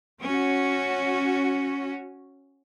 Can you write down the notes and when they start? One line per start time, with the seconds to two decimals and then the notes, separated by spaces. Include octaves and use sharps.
0.23 C#4 F#4